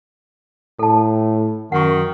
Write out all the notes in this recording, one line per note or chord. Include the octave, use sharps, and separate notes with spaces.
A2 A4 A5
F#2 D#3 F#5 C#6